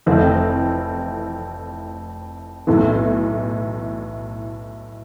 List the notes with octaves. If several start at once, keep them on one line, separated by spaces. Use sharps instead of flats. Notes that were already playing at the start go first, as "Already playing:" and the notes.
F1 F2 E3 A3 C4
B1 A2 E3